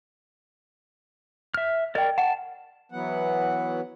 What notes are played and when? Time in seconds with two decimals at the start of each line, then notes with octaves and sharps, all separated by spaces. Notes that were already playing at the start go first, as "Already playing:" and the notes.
1.54 E5 F6
1.95 A#4 D5 D#5 G5
2.18 F#5 A5
2.92 E3 F#3 B3 F#5